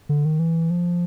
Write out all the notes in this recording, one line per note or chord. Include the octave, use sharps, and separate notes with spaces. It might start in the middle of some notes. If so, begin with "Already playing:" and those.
D3
D#3
E3
F3